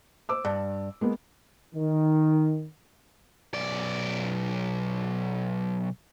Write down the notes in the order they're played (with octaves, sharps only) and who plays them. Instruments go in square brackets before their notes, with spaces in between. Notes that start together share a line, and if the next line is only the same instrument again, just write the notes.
[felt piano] C5 D6 E6
[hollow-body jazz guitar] G2 [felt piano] A5
[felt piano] G#3 A#3 B3
[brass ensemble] D#3
[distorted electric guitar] B1 D5